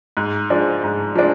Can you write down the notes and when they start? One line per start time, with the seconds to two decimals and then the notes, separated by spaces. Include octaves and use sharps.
0.17 G#2
0.50 F3 G#3 D4
0.84 G#2
1.15 F3 G#3 D4